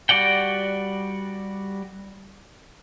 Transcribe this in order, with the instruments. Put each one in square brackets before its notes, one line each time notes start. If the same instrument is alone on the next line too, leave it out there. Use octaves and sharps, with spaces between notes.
[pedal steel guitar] G3 F#4 D5 F#5 G5